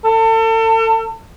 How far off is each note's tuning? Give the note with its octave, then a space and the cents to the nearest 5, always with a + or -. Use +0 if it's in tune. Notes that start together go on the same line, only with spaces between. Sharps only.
A4 +35